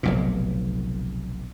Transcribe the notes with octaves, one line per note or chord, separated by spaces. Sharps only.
F1 B1 A#2